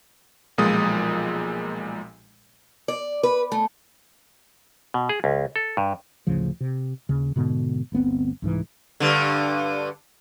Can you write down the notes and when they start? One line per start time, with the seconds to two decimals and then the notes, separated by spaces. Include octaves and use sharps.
0.58 B1 A#2 F3 G#3 D#6
2.88 D5
3.23 B4
3.52 A3
4.94 B2
5.09 G#4
5.24 C#2
5.56 A4
5.77 G2
6.27 A1 D2 C#3 F3
6.60 C3
7.09 D#2 C#3
7.36 G#2 B2 D3 B3
7.92 G1 D2 B3 C4
8.42 C2 G#2 E3
9.00 G2 D3